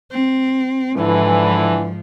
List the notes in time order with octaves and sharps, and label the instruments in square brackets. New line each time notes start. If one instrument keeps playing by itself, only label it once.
[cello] C4
[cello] G#2 F3 [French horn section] D3 E3